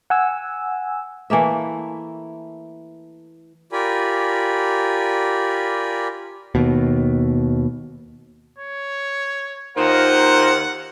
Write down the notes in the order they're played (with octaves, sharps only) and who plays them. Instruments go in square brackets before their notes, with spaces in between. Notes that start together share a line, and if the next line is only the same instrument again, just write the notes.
[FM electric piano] F#5 G#5 E6
[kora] E3 A3 A#3 E5
[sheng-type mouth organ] F4 G4 A#4 D5 G#5 B5
[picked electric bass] D#2 B2
[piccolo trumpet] C#5
[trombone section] D#2 A#4 [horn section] D#4 F4 C5 [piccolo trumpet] F#5